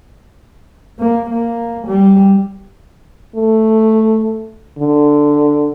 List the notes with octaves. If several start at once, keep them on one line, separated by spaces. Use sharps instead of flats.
A#3
A#3
G3
A3
D3